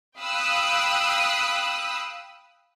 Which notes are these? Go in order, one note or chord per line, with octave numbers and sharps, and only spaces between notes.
F5 G5 B5 D#6 E6 F#6